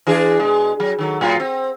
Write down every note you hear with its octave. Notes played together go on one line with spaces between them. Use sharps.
E3 D4 G#4
B2 G#3
F#3
D#3 F#3 A4
A2 F#3 F4
C4